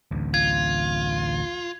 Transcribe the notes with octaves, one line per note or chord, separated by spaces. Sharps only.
A1 D2
F4 G#6